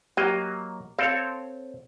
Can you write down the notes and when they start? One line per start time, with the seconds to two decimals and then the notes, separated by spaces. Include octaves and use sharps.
0.17 F#3 A#3 G4 D#5
0.99 C4 A4 C#5 F5